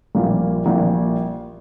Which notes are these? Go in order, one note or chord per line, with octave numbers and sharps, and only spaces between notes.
A#1 A#2 G3 A#3 F4
A#1 A#2 G3 A#3 F4